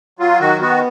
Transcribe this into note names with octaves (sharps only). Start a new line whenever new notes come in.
F#3 F4
D#3 F#4
B3 F#4